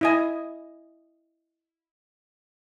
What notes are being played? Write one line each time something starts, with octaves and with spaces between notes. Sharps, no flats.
E4 D#5 G#5